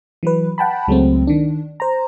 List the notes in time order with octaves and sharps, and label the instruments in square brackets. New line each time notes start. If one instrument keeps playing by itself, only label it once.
[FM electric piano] E3 F#3 B4
F#5 G5 A5 B5
C#2 F#3 G#3 A3 C4
D#3 D4
C5 A#5